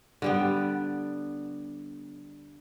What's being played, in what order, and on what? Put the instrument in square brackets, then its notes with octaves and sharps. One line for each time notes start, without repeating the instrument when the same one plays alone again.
[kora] D3 G3 B3